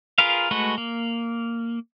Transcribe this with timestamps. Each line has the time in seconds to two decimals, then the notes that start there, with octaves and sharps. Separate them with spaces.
0.18 F4 G#4 A#4 B4 F5
0.51 G#3 A3 F#4 B4
0.78 A#3